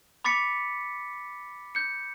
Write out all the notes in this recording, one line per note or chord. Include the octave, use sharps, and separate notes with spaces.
B5 D6 A6 B6 C#7
G6 C#7